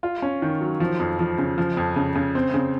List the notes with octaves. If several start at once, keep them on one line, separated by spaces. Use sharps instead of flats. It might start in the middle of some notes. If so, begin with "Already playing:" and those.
F4
C#4
D#3
F#3
F3
F2
F3
C#3
F3
F2
C#3
C#3
C4
C#3